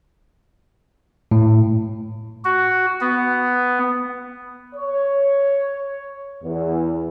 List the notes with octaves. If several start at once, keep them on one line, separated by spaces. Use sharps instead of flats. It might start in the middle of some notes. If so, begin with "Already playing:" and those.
A2
F#4
B3
C#5
E2